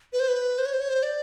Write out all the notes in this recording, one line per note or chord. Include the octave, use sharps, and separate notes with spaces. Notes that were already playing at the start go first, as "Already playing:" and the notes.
B4
C5
B4
C5
C#5
C5
C#5
C5
D5